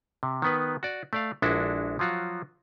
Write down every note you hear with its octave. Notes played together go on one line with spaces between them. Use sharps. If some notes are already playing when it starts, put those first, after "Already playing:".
C3
D#3 B3 B4
F#4 D5
A3 D5 F5
A#1 G#3 D4 E4 F#4 A4
F3 F#3 F4 F#4